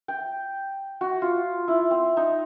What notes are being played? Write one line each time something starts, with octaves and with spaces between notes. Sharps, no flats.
G5
F#4
F4
E4
C4
D#4